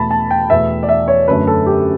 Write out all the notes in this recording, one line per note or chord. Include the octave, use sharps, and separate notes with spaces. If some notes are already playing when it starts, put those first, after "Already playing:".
Already playing: E2 B2 A3 A5 B5
A5
G5
E2 B2 A3 E5
D5
E5
C#5
F#2 D3 A3 C#4 B4
A4
G4